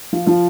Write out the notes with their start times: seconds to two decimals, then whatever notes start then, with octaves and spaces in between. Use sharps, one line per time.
0.13 F3 F4
0.26 F3 F4